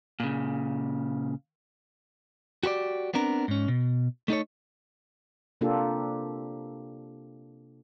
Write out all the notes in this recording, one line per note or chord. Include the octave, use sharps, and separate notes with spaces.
A#2 C#3
F#4 G4 C5 D5
B3 C4 D4 A#4
G#2 C#4
B2
A3 D#4 A4 C#5
C3 A#3 D4 F4 G4 A4